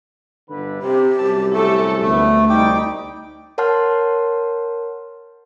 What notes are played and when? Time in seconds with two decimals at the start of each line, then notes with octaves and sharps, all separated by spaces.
0.50 G1 D3 B4
0.82 C3 G4
1.18 C2 F#2 A5
1.54 A3 G4 A4
2.02 D2 A3 B3
2.50 C2 G3 D#4 G5 D6
3.58 A#4 C#5 F#5 A5 C6 F6